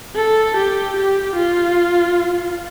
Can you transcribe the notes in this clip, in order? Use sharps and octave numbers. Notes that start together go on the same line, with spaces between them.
A4
G4
G4
F4